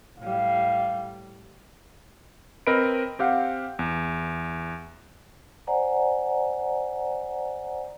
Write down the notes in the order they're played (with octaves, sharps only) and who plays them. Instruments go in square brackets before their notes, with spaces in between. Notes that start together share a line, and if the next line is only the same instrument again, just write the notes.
[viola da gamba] A2 G3 [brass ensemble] F5
[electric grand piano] C4 A#4 B4 D#5 B5 D7
C4 G4 F5 F#5
E2
[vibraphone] C5 D5 F#5 G#5 A#5